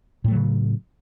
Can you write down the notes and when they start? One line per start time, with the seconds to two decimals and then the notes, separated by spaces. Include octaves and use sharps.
0.24 A2
0.28 A3
0.32 F#3
0.35 C#3